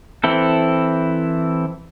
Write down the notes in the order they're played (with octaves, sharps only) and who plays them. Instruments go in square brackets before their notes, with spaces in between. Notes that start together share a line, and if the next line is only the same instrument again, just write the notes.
[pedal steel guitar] E3 C4 E4 A4